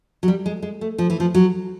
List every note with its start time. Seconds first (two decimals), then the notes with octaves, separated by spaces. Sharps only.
0.23 F#3
0.28 G3
0.46 G#3
0.62 G#3
0.81 A3
0.98 F3
1.10 E3
1.20 F3
1.35 F#3